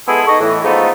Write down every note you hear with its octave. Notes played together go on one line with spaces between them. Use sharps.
G#3 B3 E4 G#4 A4
D#4 A4 D#5 C#6
A2 E3
F3 G#3 A3 B3 D#4